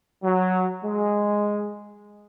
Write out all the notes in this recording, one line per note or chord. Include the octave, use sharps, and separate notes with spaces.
F#3
G#3